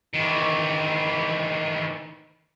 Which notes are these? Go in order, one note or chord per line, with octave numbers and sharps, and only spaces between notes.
D#3 E3